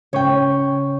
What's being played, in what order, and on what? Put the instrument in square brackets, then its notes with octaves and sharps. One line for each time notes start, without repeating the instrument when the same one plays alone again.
[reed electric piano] C#3 C#4 C#6 [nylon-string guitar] C#5 G5